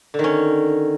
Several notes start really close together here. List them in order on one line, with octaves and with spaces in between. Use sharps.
D3 D#3 C#4